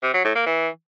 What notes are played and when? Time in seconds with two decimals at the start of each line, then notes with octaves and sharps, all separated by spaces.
0.03 C3
0.14 F#3
0.25 A2
0.35 A#3
0.46 E3